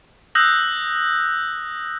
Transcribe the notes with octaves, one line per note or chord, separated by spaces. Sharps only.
D#6 E6 F#6 G6 A#6